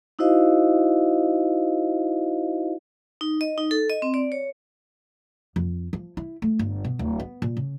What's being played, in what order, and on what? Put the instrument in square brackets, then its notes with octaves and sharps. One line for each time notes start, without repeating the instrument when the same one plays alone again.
[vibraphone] D#4 E4 F#4 C5 D#5 F5
D#4
D#5
D#4
A4
D#5
C4
D5
C#5
[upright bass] F2
F3
E4
A3
G1
B2
D1
B3
A#2
C#3